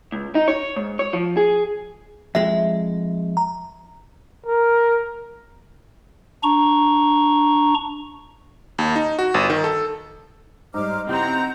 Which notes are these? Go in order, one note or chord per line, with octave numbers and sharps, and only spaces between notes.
C#2
D#4
C#5
G#2
C#5
F3
G#4
F2 G#3 E5
A#5
A#4
D4 A#5 C#6
D#2
D#4
F#4
G1
D#3
A4
G#2 G3 D#4 C5 D6 F6
C#3 C4 E4 G4 F#5 A#5 G6